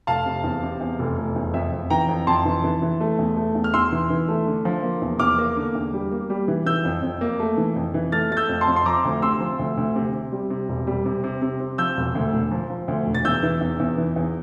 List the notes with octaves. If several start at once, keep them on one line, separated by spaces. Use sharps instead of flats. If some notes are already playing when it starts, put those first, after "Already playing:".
F1 F5 A5
C3
E2
C3
E2
F1
F1
E2
F2 E5
F2
E3 G5 A#5
F2
F2 A5 C6
E3
E3
E3
A3
E2
A3
E2
F6
E2 C6 E6
E3
E3
A3
D3
F3
A#3
E2
E2 D6 F6
A#3
D3
E2
G3
A#3
G3
E3
E3 E6 G6
F2
F2
A#3
A3
E3
F2
E3
A3 F6 A6
A3 A6
E6 G6
F2
A5 C6
F2
C6
F3 A#5 D6
D2
C3 C6 E6
F3
D2
D2
C3
C3
G3
C3
E1
G3
C3
C3
C3
C3
F3 E6 G6
E1
D2
E1
F3
F3
D2
E1
A6
E2 E6 G6
E3
E2
E2
E3
E2